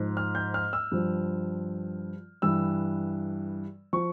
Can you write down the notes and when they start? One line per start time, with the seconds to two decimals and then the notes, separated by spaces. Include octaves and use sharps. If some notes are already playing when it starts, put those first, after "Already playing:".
Already playing: G#2 F3
0.17 F6
0.35 G6
0.54 F6
0.73 E6
0.92 G2 F3
2.42 G2 E3 E6
3.93 F3 C#6